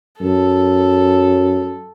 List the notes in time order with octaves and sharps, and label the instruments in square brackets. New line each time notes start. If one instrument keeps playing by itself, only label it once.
[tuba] F#2 [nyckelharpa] A4